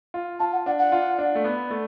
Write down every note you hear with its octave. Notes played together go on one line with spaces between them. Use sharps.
F4
F4 A5
F#5
D4 F#5
F#5
F4
D4
A3
B3
A3